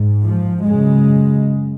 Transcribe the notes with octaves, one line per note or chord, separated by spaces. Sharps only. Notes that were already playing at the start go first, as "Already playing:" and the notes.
Already playing: G#2
F3
F#2 C#3 G#3